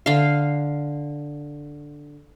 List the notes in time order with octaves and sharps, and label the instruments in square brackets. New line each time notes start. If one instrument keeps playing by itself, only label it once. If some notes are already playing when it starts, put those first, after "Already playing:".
[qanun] D3 F5